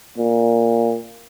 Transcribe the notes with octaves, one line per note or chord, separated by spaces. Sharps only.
A#2